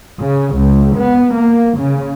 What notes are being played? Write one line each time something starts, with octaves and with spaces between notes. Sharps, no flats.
C#3
C#2
B3
A#3
C#3